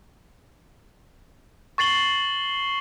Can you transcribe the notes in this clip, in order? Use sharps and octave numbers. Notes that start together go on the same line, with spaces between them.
C#6 A6 C7 F#7 G7